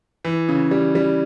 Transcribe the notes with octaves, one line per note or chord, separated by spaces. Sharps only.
E3
C#3
G3
G3